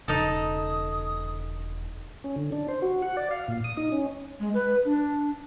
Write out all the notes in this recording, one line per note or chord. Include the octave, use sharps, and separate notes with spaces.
E1 C#3 D#4 A4 D#6
C#4
D3
D4
C5
F#4
F#5
D5
F5
A#2
D#6
D#4
C#4
G#3
B4
D4